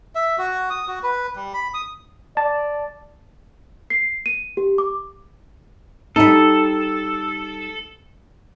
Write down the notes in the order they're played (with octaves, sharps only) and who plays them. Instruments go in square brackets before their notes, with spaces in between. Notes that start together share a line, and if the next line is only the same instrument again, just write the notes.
[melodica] E5
F#4
D#6
F#4
B4
G3
B5
D#6
[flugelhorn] D5 [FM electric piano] A5
[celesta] C7
D#7
G4
D6
[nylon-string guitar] G3 D#4 [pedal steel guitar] A4